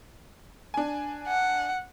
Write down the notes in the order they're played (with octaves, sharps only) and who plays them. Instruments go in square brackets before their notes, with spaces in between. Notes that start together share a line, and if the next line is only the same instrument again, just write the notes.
[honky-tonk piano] D4 G#5
[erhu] F#5